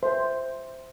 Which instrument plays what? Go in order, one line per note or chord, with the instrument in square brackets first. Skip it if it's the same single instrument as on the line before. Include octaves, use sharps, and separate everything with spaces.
[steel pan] C5 E5